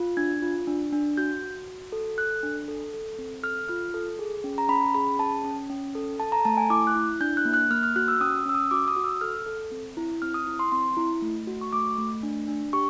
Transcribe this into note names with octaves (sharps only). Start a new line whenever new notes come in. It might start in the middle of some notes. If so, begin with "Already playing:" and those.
Already playing: F4
D4 G#6
F4
D4
D4
F#4 G6
F#4
F#4
A4
A4 F#6
D4
A4
A4
C4
A4 F6
F4 F6
A4
G#4
C#4
A#5
C#4 B5
G#4 B5
C#4 A5
C#4
C#4
A4
A4 A5
A#5
A3 A5
G#5
E4 D6
F#6
E4
D4 G6
F#6
A#3
F#6
A#3 F6
F6
F#4 F#6
E6
C#4 D#6
C#4 E6
D#6
F#4 D6
D#6
F#4
E6
A4 F6
A4
C4
E4
C4 F6
D#6
E4
C6
C4 C6
E4
A3
F#4
C#6
A3 D6
A3
D4
D4
G4 C#6